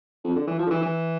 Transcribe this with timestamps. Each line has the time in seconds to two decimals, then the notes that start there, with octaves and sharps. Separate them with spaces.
0.24 F2
0.36 D3
0.47 E3
0.59 F3
0.67 D3
0.70 E3
0.82 E3